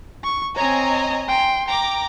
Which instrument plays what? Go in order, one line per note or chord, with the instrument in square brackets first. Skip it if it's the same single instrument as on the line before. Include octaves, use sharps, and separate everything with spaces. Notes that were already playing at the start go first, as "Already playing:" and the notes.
[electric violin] C#6
[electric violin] C4 C#5 [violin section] D#5 G#5 A#5
[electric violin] G5 C6
[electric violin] G5 [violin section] A#5 D6